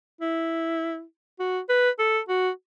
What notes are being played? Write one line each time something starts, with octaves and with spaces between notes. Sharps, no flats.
E4
F#4
B4
A4
F#4